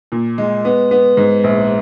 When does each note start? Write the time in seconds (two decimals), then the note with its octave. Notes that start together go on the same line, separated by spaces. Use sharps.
0.12 A#2
0.38 G#3
0.65 B3
0.91 B3
1.17 G#2
1.44 A#1